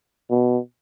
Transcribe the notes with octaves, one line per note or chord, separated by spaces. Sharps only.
B2